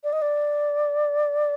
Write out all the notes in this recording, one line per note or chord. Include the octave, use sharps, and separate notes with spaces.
D5
D#5
D5